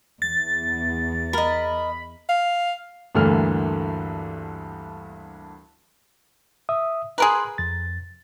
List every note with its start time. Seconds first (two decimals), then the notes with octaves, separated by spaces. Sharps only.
0.22 E2 A6
1.33 A#4 D#5 B5
2.29 F5
3.15 D2 G2 D3 E3 A#3 F6
6.69 E5 D#6
7.18 G#4 A#4 B4 A#5 C6
7.58 F2 A6